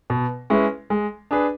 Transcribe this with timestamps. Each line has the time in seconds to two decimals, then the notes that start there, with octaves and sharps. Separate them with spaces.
0.10 B2
0.50 G#3 C#4 E4 B4
0.90 G#3
1.31 D4 G#4 B4